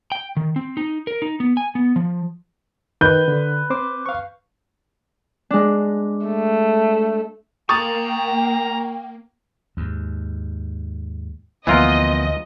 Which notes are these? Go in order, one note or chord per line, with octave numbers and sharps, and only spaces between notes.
G5
D#3
C4
D#4
A#4
D#4
B3
G#5
B3
F3
D#3 B4 G6
D3
C4 C5 D6
F5 C#6
G#3 D4
A3
A#3 G5 G#5 A#5 C#6 D#6 A6
D#2 G#2
D2 E3 F3 A#3 B3 F4 A#4 D#5